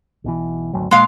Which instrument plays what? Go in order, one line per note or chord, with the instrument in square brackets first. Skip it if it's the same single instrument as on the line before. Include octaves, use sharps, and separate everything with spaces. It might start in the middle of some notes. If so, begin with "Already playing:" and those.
[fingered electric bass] B1 B2 E3
G#1 D2 F#3
[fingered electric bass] A#2 A#3 [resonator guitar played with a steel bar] G#3 F5